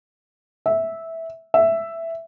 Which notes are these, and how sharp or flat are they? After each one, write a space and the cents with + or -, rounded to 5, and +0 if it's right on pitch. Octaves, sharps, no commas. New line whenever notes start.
E5 -10
E5 +5